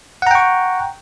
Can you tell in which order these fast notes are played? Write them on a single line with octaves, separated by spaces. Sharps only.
F#5 A#5 G5 C#6